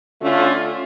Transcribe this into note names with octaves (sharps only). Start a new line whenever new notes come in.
D3 A3 C#4 F4